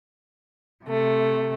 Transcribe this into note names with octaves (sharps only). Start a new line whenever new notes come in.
C3 A3